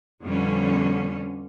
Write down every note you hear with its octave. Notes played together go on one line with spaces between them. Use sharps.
F2 B2 D3 G3 C#4